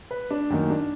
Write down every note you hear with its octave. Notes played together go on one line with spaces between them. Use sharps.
B4
D4
F#2 D#3 A#3 D#4
D4